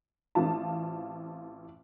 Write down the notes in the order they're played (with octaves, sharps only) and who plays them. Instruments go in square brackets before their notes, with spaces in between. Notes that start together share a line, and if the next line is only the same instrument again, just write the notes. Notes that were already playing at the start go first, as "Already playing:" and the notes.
[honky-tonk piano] A1 C4 F4 A5